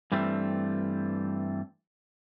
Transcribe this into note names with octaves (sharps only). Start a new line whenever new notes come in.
G2 E3 G3 A3 C4